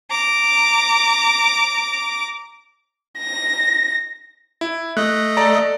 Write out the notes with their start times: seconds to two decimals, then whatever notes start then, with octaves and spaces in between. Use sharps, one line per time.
0.11 A#5 D6
3.18 A#6
4.61 E4
4.97 A3 D#5 F#6
5.37 A4 D5 A#5